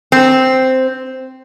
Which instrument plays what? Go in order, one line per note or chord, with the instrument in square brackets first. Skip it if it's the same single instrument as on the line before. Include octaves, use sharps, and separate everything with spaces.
[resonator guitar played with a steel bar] C4